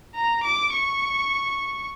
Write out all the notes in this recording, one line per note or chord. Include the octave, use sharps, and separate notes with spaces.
A#5
D6
C#6